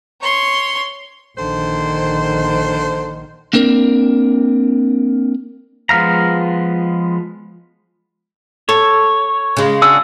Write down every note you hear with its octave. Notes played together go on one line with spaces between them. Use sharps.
C#5 C6
A#1 D3 D#3 C5
A#3 C4 D4 A#4
F3 G#3 B3 F5 A#5
A4 C#5
C#3 G#3
D4 F#4 G#4 E6